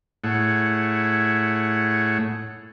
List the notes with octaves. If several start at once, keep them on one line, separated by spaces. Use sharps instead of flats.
A2 A3 E4 G#4 C#5 F#5